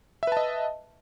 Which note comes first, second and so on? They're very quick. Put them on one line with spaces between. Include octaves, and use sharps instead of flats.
E5 B4 A5 D#5